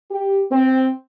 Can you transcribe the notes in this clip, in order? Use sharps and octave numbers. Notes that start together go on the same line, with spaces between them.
G4
C4